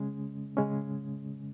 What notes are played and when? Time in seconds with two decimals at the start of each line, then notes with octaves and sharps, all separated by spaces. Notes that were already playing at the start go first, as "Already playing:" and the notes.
Already playing: C#3 G#3 C#4
0.57 C#3 G#3 C#4